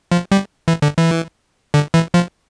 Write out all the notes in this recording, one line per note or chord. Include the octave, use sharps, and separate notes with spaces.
F3
G3
E3
D3
E3
D3
E3
F3